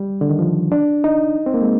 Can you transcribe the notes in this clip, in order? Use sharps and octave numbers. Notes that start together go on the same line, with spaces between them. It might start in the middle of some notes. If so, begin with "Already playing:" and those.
Already playing: G3
D3
D#3
F3
D4
D#4
C4
A#3
G#3